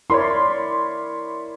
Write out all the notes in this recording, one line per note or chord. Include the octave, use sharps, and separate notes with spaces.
E4 A#4 C#5 D5 B5 C6